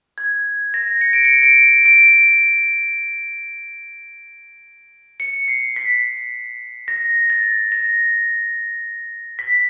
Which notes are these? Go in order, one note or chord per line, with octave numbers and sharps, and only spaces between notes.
G#6
A#6
C#7
D7
C#7
D7
D7
C#7
C7
B6
A#6
A6
A#6
B6